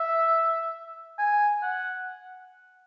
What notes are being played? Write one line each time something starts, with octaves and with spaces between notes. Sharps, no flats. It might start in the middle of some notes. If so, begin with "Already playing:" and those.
Already playing: E5
G#5
F#5